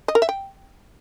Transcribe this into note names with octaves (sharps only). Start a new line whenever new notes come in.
D#5
A#4
E5
G5